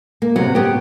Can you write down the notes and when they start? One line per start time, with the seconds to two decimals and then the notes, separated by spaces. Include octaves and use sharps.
0.22 A#3
0.36 C3 F#3 B3
0.55 B3 C4 G4